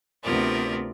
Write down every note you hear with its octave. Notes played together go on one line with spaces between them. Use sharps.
D2 C3 B3 F4 A#4 D5